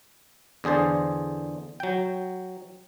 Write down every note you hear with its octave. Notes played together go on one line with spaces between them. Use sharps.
E2 D3 G#4 C5 A5
F#3 G5